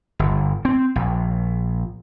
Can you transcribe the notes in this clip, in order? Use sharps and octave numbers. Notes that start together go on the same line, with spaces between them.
G1
C4
A#1